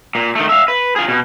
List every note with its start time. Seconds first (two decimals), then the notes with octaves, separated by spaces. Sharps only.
0.15 A#2
0.35 D#3 A3
0.49 E5 F5
0.68 B4
0.96 F4 G#4
1.08 B2